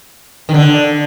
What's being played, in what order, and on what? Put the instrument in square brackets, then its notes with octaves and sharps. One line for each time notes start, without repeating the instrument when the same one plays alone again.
[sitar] D#3
D3